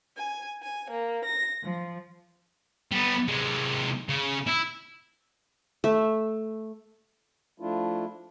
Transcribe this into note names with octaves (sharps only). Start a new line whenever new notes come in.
G#5
G#5
A#3
A#6
F3
G3 B3
C3 G#3
C#3
E4
A3 E5
F3 A3 D4 E4 F4